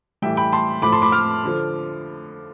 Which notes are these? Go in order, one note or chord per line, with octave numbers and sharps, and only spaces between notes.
A2 E3 G3 E5 G5
G5 B5
A5 C6
A2 F3 B5 D6
A5 C6
B5 D6
D6 F6
D3 F3